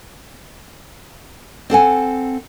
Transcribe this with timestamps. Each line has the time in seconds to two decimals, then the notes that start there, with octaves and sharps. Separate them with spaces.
1.70 C4 A4 F#5 G#5